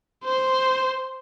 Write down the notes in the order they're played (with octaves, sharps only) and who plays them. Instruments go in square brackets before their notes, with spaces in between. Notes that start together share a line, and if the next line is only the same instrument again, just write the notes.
[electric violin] C5